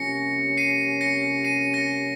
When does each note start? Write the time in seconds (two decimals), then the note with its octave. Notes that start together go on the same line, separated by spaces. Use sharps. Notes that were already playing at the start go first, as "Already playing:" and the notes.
Already playing: F2 C3 G3 A#3 C#4 A#6 C#7
0.57 C7 D#7
1.01 A#6 C#7
1.45 C7 D#7
1.73 A#6 C#7